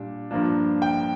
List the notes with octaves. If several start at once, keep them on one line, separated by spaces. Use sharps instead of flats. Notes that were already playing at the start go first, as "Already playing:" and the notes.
Already playing: A#2 G3 D4
G2 F3 A#3 D4
G5